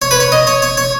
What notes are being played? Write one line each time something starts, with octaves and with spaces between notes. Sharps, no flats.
C#5
B4
C#5
D#5
C#5
C#5
C#5